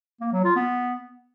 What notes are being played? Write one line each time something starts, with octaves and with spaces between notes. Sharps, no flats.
A#3
F#3
F4
B3